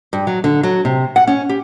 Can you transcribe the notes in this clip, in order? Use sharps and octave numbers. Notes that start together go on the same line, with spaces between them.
G2
F#3
D3
F#3
C3
F#5
C#4
G4